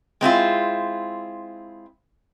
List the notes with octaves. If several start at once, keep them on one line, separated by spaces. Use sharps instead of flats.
G#3 C4 E4 F4